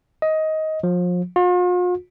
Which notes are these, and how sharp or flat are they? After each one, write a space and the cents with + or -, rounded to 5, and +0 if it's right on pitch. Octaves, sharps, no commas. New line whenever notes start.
D#5 +15
F3 +35
F4 +45